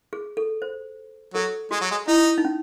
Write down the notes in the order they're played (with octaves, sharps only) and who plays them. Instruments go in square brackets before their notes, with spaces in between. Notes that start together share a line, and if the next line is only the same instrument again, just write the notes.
[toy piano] G#4
A4
C5
[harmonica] F#3 [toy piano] A4
[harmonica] G#3 [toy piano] F#4
[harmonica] F#3
G#3
[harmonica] D#4 [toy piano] E4
[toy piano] D#4
C#4